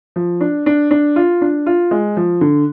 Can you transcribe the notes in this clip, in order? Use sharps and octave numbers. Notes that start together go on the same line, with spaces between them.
F3
D4
D4
D4
F4
D4
F4
G#3
F3
D3